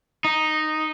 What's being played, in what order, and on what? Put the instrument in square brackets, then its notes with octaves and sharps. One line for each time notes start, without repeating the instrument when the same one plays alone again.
[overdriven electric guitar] D#4